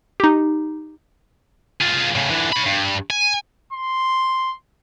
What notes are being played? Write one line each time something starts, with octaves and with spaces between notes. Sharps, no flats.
D#4 G4
F4 G#4
A2 C#3
D3 E3
C#5 B5
G2
G#5
C6